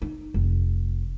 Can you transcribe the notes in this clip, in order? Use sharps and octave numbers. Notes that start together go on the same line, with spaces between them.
D#4
F1